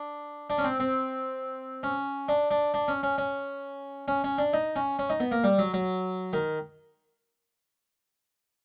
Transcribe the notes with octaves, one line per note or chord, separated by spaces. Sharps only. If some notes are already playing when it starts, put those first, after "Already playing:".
Already playing: D4
D4
C#4
C4
C4
C#4
D4
D4
D4
C#4
C#4
C#4
C#4
C#4
D4
D#4
C#4
C#4
D#4
B3
A#3
G3
F#3
F#3
D#3